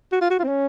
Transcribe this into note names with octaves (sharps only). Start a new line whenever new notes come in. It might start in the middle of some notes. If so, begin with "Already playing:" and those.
F#4
F4
F#4
F4
C4
C#4